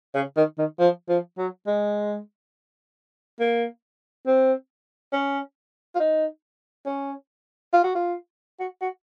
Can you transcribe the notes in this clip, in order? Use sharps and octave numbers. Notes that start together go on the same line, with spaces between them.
C#3
D#3
D#3
F3
F3
F#3
G#3
A#3
C4
C#4
F4
D#4
C#4
F4
F#4
F4
F#4
F#4